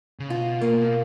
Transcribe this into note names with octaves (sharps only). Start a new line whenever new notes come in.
C#3
B2 F4
A#3